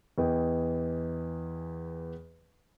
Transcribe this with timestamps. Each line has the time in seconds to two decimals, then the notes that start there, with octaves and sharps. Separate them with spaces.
0.18 E2 E3 D#5 G5